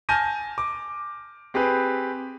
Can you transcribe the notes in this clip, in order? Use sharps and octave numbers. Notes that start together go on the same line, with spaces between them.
G#5 A5 F6 G6 A#6 D#7
D6
C4 G4 G#4 B4